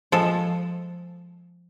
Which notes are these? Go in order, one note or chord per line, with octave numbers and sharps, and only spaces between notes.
F3 G#3 A4